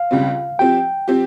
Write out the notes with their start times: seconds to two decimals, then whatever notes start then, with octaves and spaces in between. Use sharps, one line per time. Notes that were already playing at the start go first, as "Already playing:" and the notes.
Already playing: F5
0.11 C#2 C#3 G3 C4
0.59 F3 C4 G4 G5
1.08 F3 C4 G4